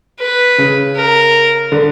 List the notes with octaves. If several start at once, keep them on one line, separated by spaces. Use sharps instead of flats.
B4
C#3
A#4
D3